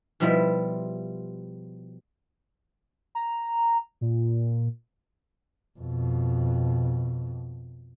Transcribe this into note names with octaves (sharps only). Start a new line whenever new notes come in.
B2 F3 G3 E4 F4 E5
A#5
A#2
F2 B2